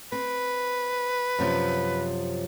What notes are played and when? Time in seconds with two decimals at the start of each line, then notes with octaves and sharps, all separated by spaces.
0.12 C4 B4
1.39 F#2 C3 F3